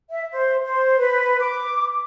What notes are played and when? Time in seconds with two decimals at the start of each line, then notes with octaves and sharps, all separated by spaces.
0.09 E5
0.32 C5
0.64 C5
0.98 B4
1.41 D6